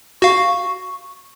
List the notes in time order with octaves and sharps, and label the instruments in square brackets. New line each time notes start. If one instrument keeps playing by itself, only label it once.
[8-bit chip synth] F#4 F5 [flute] C#6